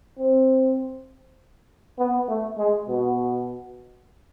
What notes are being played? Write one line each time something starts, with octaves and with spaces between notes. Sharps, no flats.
C4
B3
A3
G#3
B2